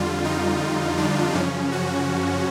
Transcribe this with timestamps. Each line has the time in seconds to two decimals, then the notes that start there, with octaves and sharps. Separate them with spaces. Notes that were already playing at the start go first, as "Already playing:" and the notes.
Already playing: F2 D3 G3 F4
0.24 D#4
0.98 D4
1.34 F#2 C#3 F3 C#4
1.72 F#4